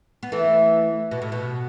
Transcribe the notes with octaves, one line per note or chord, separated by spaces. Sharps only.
B3
E3 A3
B2
A2
B2